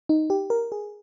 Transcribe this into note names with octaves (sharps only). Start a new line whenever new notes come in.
D#4
G4
A#4
G#4